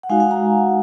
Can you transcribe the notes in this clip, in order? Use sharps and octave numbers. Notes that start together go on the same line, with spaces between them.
F#5
G#3 D#4 F#4 F5 G#5
F5 G#5
F#5 A#5